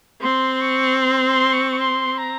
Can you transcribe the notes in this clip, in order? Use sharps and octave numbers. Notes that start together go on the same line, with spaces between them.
C4 C6
C#6
C6
C6
C#6
C#6
C6
A#5